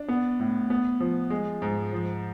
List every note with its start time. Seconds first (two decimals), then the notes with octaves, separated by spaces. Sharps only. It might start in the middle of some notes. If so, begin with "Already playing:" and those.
Already playing: D4
0.08 B3
0.40 A2
0.70 B3
1.00 F3
1.30 G#3
1.62 G#2
1.93 F3